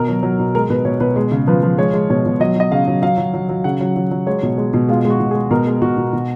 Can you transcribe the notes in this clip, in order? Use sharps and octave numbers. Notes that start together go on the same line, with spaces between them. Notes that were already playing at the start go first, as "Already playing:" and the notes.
Already playing: B2 A#4
F#3
F#3
B2
G#3 A#4
B2 B4
B2 C#5
B2 B4
G#3
C#3
F3 B4
F3
G#3 C#5
G#3
B2 C#5
B2
F#3 D#5
F#3 D#5
C#3 F5
F#3
F#3 F5
F#3
F#3
F#3
C#3 F#5
F#3
F#3
F#3
G#3 C#5
B2
G#3
B2
G#3 F4
G#3
F#4
B2
G#4
G#3
B2 A#4
G#3
B2 F#4
B2
B2